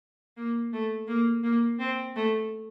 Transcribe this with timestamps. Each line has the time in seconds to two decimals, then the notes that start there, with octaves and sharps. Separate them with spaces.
0.37 A#3
0.73 A3
1.08 A#3
1.43 A#3
1.79 C4
2.15 A3